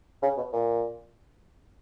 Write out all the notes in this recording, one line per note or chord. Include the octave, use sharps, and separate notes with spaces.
C#3
B2
A#2